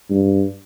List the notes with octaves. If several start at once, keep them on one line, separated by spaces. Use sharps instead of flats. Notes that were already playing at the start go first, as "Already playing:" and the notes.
G2